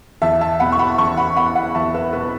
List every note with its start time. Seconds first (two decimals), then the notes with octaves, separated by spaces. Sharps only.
0.22 E2 E5 A5
0.41 E5 A5
0.60 B2 F#5 B5
0.72 C#6
0.79 F#5 B5
0.98 E2 A5 C#6
1.17 F#5 B5
1.36 B3 F#5 B5
1.55 F#5 B5
1.75 E2 E5 A5
1.94 B4 E5
2.13 B2 B4